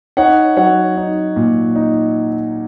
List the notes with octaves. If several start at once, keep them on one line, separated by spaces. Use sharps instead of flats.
D#4 C#5 F#5
F#3 C#5 F#5
D#4
A#2
D#4